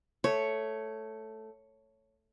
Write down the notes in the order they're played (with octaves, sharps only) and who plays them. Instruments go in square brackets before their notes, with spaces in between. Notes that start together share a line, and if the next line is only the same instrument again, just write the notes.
[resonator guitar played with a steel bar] A3 [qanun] C#5